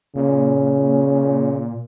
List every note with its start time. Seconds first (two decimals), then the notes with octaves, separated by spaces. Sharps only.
0.16 A#2 C#3